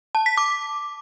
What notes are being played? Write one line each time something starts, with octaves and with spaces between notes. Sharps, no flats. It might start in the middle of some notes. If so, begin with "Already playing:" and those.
A5
B6
D6